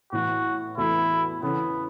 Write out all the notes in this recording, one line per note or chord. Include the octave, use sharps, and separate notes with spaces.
A2 E3 B3 F#4
E2 E3 A3 E4 F#4 A4
C#3 E3 B3 C#4 A4